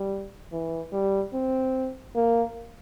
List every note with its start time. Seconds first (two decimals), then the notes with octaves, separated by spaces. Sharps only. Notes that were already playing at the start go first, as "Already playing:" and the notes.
Already playing: G3
0.52 E3
0.93 G3
1.33 C4
2.16 A#3